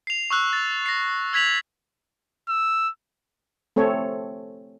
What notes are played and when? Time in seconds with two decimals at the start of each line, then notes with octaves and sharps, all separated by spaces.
0.07 C7 F7
0.30 C#6 E6 F#6
0.53 A6
0.86 A#6 C7
1.33 E6 G#6 B6 F7 F#7
2.49 E6
3.76 A3 C4 A4 C#5